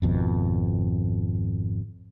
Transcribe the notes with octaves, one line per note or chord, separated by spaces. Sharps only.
G#1 F2 B2